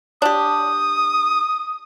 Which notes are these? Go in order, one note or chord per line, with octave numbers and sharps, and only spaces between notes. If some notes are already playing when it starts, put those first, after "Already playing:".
D4 G4 D#6